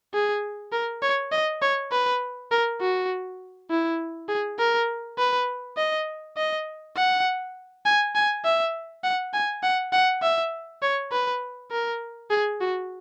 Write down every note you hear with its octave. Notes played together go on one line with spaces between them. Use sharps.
G#4
A#4
C#5
D#5
C#5
B4
A#4
F#4
E4
G#4
A#4
B4
D#5
D#5
F#5
G#5
G#5
E5
F#5
G#5
F#5
F#5
E5
C#5
B4
A#4
G#4
F#4